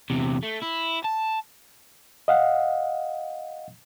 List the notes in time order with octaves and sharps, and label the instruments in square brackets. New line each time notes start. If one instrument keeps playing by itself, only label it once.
[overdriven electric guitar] E2 C3
A3
E4
A5
[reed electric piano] D#5 F5 F#5